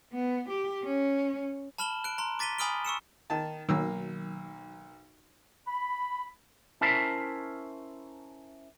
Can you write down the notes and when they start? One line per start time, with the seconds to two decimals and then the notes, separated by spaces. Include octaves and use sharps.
0.12 B3
0.49 G4
0.83 C#4
1.78 A5 B5 F6 E7 F#7 G7
2.04 F#6 D7
2.18 A#5 C6
2.39 D6 A6 B6 D#7 G7
2.58 G#5 B5 D#6 F6 D7 G7
2.85 C#6 E6 C#7 E7
3.30 D#3 A5
3.69 B1 D#3 F#3 A#3 E6
5.68 B5
6.81 C#4 E4 A#4 C5 A5 B5